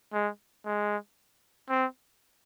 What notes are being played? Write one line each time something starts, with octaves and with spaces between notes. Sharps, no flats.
G#3
G#3
C4